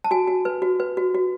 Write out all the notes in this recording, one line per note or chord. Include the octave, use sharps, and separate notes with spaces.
A5
F#4 G#5
F#4
B4
F#4
B4
F#4
F#4